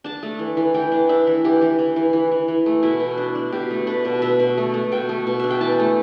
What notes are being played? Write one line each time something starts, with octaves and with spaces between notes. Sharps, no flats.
D4 A5
A3
E3
E3
E3 G5
D4
D4 E5
E3
E3 G4
E3
E3
E3
E3
E3
E3
A3
B2 E4
B2
D4
D4
B2 G4
A3
D4 B4
B2
B2 E5
B2
A3
A3
B2 G5
A3
B2
D4 E5
G5
E3 A5
A3